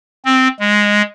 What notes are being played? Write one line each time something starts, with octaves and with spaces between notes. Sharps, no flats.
C4
G#3